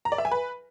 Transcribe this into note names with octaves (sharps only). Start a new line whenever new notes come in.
A#5
D5
E5
G#5
B4